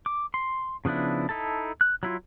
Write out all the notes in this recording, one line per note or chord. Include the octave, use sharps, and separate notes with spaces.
D6
C6
C#3 F3 B3 D4 E4
D#4 E4 A4 A5
F#6
F#3 E4 F4